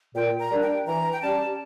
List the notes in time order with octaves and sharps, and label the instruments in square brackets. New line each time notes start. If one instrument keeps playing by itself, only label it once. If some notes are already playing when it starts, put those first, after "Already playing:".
[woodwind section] A#2 [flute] G5
[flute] A#5
[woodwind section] G3 A#3 D4
[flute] G5
[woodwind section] E3 [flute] A#5
[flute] G5
[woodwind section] G3 C#4 G4 [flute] A5